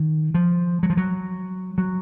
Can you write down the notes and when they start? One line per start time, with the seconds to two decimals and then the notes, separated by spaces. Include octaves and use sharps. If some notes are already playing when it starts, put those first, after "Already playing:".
Already playing: D#3
0.34 F3
0.83 F#3
0.90 F3
0.97 F#3
1.78 F#3